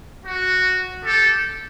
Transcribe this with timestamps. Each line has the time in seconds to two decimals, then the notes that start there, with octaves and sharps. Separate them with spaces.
0.25 F#4
1.03 G4 A4